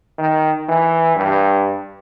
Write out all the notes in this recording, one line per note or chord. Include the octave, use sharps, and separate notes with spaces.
D#3
E3
G2